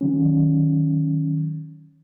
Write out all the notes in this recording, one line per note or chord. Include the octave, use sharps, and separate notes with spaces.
D#3 F#3 C#4